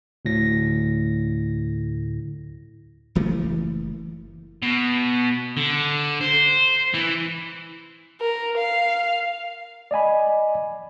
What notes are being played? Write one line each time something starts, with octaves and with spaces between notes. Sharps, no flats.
D2 A2 A#6
F#1 E3 A3 A#3
B2
D3
C5
E3
A#4
F5
D5 D#5 G#5 B5